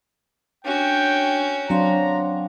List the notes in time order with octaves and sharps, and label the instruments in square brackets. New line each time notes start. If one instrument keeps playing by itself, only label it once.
[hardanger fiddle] C#4 F#4 [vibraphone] D4 [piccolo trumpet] G5
[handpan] F#3 C4 D4 [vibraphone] C#5 F5 C6 [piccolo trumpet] A#5